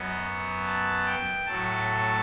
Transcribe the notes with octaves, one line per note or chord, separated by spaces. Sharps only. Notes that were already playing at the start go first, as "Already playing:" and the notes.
Already playing: F#2 F#3 B3 D#5
A5
G5
A2 F#3 A3 A5